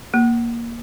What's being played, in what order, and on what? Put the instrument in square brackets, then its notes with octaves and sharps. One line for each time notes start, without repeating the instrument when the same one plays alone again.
[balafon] A#3